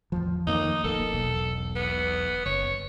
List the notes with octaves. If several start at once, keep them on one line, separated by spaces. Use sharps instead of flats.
A1 E2 F3
F2 D#3 A#3 D#4
D#1 A#1 A#3 A4
E1 B1
B3
F#1 C#5